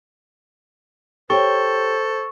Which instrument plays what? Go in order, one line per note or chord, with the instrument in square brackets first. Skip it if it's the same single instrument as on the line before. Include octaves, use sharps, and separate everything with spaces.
[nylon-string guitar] G4 C#5 [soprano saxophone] A4 [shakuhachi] C5 [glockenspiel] C#6